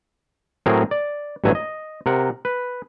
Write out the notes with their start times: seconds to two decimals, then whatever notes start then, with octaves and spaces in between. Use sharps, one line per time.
0.66 A2 F#3 C4 G#4 A#4
0.91 D5
1.44 A1 G2 F#3 E5 G#5
1.55 D#5
2.06 C3 A#4 F#5
2.45 B4